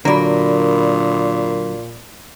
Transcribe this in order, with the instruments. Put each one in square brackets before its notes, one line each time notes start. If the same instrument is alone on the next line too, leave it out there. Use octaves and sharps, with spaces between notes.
[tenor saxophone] A#2 [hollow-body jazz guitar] D3 F#3 [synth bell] A#4 D5 B5